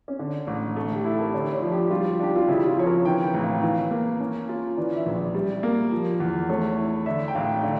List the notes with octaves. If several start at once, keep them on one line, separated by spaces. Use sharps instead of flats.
C#4
D3 D4
A1
A3
G4
E4 A4
A#4
D3 C#5
D5
C#5
F3
G4
G4
G3 F4
D4 G4
F4
C#3 E4
F4
F3 C#5
A#4
E3 G5
G5
A1
F5
E3 F5
A#3
C#4
F4
E3 D5
E5
A#1
D5
G3
A#3
F3
E2
A3 C#5
E4
D3 E5
G5
A1 F5
D3